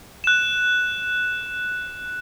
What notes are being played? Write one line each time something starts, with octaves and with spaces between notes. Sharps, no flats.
F#6 E7